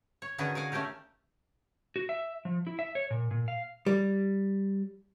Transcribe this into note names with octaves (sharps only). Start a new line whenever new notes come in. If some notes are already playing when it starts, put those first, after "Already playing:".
C#5
D3 D#3 C#4 F#4 G#4 B4
A#4 F5 F#5 G#5
A3 C#4 F4 G4 A#4
F#4
E5
F3
E4
E5
C#5
A#2
A#2
F5
G3